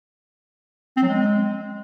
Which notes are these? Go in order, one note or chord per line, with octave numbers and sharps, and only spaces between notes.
C4
F#3
G#3